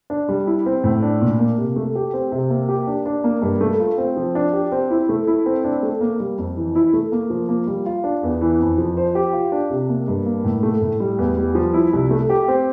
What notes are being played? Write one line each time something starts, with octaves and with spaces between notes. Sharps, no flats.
D4
G3
E4
C4
A2
D4
A#2
A#3
C3
A3
G4
C4
C3
A#3
G4
D4
D4
A#3
G2
A3
F4
C4
F3
D4
G4
C4
E4
A3
E4
C4
D4
A3
A#3
G3
F2
E3
E4
A3
A#3
F3
A#3
G3
F4
D4
E2
E3
F2
F3
C5
G4
F4
D4
C3
A#3
G2
A#3
A2
A3
A2
G3
E2
G3
F3
E4
C2
A3
G4
C4